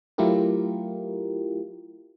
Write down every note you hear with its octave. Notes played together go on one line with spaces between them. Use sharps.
F#3 A3 E4 F4 G4 A#4